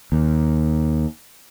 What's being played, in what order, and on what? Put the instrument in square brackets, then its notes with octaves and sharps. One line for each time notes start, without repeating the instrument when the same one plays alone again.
[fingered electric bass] D#2